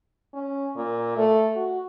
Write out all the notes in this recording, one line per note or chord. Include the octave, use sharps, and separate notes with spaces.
C#4
A#2
A3
F#4